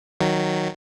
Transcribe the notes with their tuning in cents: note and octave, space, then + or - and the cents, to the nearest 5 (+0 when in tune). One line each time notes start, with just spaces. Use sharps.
D#3 +0 F#3 +0